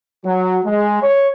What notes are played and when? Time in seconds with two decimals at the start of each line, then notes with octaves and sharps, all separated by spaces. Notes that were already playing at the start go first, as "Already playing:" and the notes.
0.25 F#3
0.65 G#3
1.01 C#5